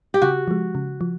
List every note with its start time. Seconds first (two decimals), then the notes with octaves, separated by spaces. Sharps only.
0.14 G4
0.22 C#3 F#4
0.48 F3 G#3
0.75 C#3
1.01 F3